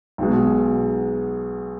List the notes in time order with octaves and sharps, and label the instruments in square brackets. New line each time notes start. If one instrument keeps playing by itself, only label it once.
[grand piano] B1 B2 G#3